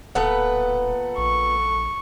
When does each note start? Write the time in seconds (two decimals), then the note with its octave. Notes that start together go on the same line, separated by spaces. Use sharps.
0.15 D1 A#2 B3 A4 B4 F#5
1.17 A#1 C#6